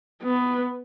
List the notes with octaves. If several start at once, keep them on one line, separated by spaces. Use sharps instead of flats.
B3